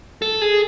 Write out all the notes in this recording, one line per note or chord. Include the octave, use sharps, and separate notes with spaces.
A4
G#4